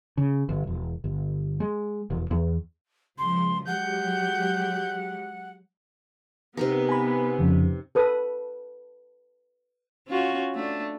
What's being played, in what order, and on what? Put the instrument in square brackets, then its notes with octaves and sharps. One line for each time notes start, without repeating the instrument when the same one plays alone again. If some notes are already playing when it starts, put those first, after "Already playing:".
[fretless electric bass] C#3
G1
E1
G1
G#3
E1
E2
[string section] C#2 F3 [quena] C6
[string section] F#3 G#3 G4 [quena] F#5 [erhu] G6
[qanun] C3 D#4 A#4 [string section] B3
[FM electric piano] G#5 B5
F2 C#3
[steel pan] A4 B4 D#6
[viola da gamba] C#4 F4 F#4
A3 D4